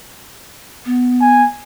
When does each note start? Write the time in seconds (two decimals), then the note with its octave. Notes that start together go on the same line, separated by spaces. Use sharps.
0.86 B3
1.21 G#5